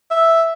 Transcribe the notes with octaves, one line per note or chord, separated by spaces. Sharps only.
E5